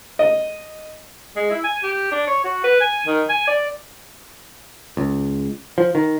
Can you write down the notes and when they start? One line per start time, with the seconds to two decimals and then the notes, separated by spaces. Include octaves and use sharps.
0.19 D#5
1.36 G#3
1.51 E4
1.64 G#5
1.83 G4
2.11 D4
2.27 C#5
2.44 F#4
2.64 B4
2.81 G#5
3.07 D#3
3.29 G#5
3.47 D5
4.97 C#2
5.78 F3
5.95 D#3